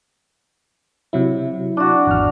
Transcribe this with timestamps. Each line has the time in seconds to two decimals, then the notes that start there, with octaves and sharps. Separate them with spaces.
1.13 C3 F#3 E4
1.77 D4 F#4
2.07 G#1 E2 F6